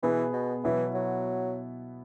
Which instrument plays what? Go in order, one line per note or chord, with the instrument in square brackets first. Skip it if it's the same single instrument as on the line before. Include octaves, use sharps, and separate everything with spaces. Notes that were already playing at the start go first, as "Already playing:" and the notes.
[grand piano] B2 B3 G#4 B4 [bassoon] E3
[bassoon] B2
[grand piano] B2 F#3 B3 E4 B4 [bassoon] E3
[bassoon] F#3